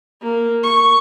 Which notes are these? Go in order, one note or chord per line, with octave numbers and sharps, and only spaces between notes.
A#3
C#6